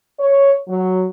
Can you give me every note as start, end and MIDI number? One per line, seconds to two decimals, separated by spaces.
0.20 0.51 73
0.68 1.05 54